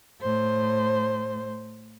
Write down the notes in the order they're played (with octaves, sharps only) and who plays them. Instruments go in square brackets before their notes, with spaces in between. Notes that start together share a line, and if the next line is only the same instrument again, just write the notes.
[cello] A2 C5